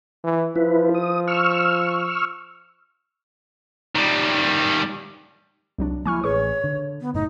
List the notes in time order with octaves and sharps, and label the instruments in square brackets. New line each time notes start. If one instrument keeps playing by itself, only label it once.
[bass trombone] E3
[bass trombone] F3 [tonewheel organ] E4 B4
[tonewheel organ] D#6
C#6 E6 F6
[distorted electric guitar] D#3 G3
[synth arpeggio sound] C2 F#3 D4
[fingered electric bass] F3 G#3 A#3 [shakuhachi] E4 [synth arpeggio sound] G#5 C#6 F6
[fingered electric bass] A1 [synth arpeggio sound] G#4 B4 C#6 [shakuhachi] C#5
[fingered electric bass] D3
[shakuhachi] B3
[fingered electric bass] F#1 A2 [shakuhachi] D#4